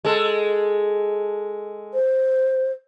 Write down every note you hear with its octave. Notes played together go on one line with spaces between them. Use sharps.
G#3 A4
C5